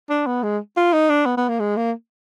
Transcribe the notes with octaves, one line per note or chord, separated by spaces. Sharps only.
D4
B3
G#3
F4
D#4
D4
B3
B3
A#3
G#3
A#3